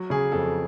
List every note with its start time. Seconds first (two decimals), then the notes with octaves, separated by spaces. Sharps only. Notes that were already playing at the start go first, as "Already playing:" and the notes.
Already playing: F#3
0.10 C#3 G#4
0.32 F2 A4